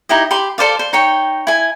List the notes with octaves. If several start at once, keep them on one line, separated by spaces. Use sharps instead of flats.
D#4 E4 G4 D#5
G4 B5 C6
A4 C5 D5 F5
C5
D#4 C#5 G5
E4 G#5